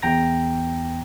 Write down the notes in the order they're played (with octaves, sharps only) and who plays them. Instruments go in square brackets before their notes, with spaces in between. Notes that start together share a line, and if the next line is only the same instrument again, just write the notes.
[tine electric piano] E2 G5 A#5 A#6